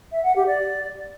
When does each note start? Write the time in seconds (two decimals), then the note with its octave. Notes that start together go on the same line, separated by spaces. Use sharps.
0.11 E5
0.23 F#5
0.34 G4
0.46 D5